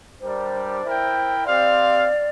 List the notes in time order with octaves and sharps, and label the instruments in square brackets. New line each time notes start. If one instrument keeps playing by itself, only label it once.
[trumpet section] G3 D4 G4 A#4 D5 [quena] C5
[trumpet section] E4 A#4 E5 G5
[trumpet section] C4 G4 C5 F5 [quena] D5